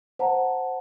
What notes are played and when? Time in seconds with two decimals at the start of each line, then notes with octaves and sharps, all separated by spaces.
0.19 C5 F#5 A5 A#5